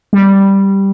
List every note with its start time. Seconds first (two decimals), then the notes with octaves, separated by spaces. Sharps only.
0.13 G3